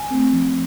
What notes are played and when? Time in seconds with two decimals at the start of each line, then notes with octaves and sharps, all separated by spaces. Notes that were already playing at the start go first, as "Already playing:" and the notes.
Already playing: G#5
0.11 A3 C4
0.33 F3